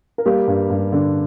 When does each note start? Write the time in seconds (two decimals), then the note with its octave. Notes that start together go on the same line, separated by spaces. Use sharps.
0.18 A#4
0.26 G3 A#3 G4
0.48 G2
0.70 G2
0.92 D3